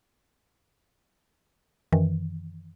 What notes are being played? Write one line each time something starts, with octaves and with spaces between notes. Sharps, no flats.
F#2 D#3 E3